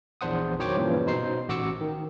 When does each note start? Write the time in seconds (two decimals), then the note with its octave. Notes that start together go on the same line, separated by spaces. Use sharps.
0.21 A#1 E2 D4 C5 F#5 D#6
0.59 D#3 F#3 C5 C#5 G5 D6
0.77 G2 A#2 C#3 E3 F3
1.06 B2 D#4 C5 C7
1.49 A1 F#4 D6 E6 C#7
1.81 D#3